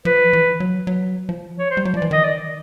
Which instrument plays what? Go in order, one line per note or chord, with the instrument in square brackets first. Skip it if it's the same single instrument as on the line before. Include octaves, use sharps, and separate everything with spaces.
[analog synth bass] F3 [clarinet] B4
[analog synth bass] E3
F#3
F#3
F3
[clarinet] C#5
C5
[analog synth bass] G3
F#3
[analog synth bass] F3 [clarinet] D5
[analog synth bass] E3
[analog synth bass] D#3 [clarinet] D#5
[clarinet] D5